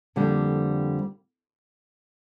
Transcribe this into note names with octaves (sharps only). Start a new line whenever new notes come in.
F2 D3 G3 A#3